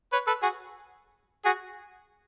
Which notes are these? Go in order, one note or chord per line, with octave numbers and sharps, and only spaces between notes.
B4 C#5
A4 B4
F#4 G#4
F#4 G#4